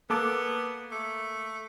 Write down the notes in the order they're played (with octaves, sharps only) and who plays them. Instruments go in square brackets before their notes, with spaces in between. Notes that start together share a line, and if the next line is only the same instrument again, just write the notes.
[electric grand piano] A#3 A4 D6 [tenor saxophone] B3
[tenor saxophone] A3